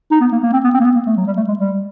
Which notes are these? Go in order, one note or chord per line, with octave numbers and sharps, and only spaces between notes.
D#4
B3
A#3
A#3
C4
B3
C4
A#3
B3
A#3
A3
F#3
G3
A3
G#3
G3